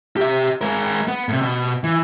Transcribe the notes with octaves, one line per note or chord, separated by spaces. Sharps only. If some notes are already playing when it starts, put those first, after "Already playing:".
G4 E5
G#3 A#4
B3
A2 C3
B2
E3